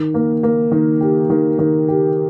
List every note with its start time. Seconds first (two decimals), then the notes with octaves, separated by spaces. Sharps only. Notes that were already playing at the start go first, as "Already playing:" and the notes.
Already playing: D#3
0.14 A#3
0.43 A#3
0.72 D#3
1.00 G4
1.30 D#3
1.59 D#3
1.88 G4